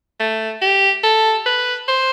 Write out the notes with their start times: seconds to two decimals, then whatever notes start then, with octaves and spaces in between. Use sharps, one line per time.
0.20 A3
0.62 G4
1.03 A4
1.46 B4
1.88 C5